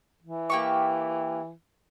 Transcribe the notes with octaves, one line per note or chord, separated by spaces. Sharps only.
E3
A#3 G4 C#6